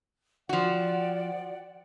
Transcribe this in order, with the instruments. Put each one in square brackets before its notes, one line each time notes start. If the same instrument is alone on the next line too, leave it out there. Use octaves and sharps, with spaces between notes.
[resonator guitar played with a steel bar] F3 F#4 [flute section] D5 F#5 G5